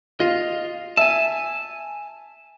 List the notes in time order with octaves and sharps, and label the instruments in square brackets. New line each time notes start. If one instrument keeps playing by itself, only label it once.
[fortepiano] F4 [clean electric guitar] D#5 F5
[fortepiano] E5 [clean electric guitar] G#5 A5